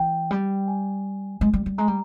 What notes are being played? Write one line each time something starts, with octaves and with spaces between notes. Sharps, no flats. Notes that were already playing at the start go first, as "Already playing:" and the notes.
Already playing: E3 G5
G3
G#5
G#3
G3
G3
G#3 A#5
G3